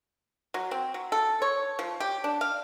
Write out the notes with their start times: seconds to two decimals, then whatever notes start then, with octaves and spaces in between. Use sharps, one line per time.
0.54 F#3
0.71 C4
0.94 F#3
1.12 A4
1.42 C#5
1.79 F3
2.00 G4
2.24 D4
2.41 F5